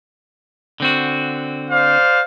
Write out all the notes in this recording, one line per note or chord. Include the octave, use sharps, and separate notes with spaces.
D3 C4 F#4
C5 D5 F5